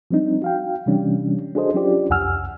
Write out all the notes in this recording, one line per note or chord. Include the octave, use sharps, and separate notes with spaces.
F3 G3 C4 D4 D#4
F#4 F5 G5
C3 E3 G3 C#4 D4
D4 F#4 G#4 A4 C5 D#5
F#3 C#4 D4 F4 G4 D5
C2 F2 F#5 G#5 E6 F6